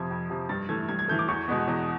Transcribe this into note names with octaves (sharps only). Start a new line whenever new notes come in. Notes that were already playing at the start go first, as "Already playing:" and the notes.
Already playing: F2 C3 F3 G#6
F2
C3 F3
G2 A6
E3 A3 G#6
G2 G#6
G#6
E3 A3 G6
D6
E2 C#6
B2 G#3 B3
E2